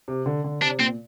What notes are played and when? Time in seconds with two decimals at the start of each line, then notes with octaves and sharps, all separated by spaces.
0.08 C3
0.26 D3
0.44 D3
0.62 C3 D4
0.80 A#2 C4